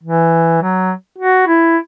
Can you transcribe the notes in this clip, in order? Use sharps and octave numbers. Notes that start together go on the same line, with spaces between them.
E3
F#3
F#4
E4